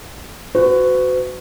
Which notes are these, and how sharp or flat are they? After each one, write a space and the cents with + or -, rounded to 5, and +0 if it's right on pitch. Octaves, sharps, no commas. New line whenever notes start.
F#4 +0 B4 +45